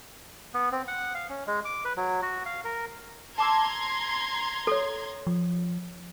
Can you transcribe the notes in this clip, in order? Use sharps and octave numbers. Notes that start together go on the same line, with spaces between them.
B3
C4
F#5
F5
C#4
G#3
D6
B4
F#3
F#4
F5
A#4
A5 A#5 C6 D6 E6 G#6
A4 C#5
F3